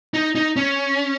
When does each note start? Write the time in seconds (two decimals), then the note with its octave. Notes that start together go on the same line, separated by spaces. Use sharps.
0.14 D#4
0.35 D#4
0.56 C#4